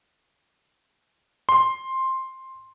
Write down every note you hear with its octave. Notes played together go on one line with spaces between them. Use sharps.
C6